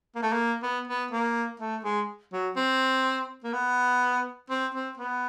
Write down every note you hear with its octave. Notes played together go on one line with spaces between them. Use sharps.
A#3
A3
A#3
B3
B3
A#3
A3
G#3
F#3
C4
A#3
B3
C4
C4
B3